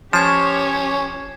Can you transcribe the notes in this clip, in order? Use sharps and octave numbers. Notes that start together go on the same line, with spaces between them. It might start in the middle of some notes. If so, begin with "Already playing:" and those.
F3 C#4 G4 C#5 G#6 C7 E7